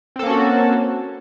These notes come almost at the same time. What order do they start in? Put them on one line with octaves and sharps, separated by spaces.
C4 A4 A#3 C#4 F#4